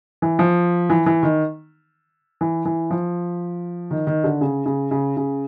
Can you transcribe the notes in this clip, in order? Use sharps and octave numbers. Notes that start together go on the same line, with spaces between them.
E3
F3
E3
E3
D#3
E3
E3
F3
D#3
D#3
D3
C#3
C#3
C#3
C#3